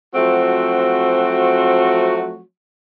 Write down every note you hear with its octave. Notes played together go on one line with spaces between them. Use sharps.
F3 F#3 A3 C4 F#4